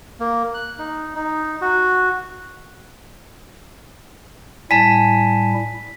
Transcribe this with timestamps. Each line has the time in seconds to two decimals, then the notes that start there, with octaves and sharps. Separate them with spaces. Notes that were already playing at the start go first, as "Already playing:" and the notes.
0.20 A#3
0.54 F#6
0.79 D#4
1.15 D#4
1.62 F#4
4.71 A2 G3 E4 G#5 A5 B6